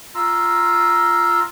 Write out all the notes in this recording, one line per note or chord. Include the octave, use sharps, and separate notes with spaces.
F4 A#5 C6 E6